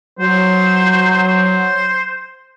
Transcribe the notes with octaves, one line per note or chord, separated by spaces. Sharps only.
F#3 C5
C5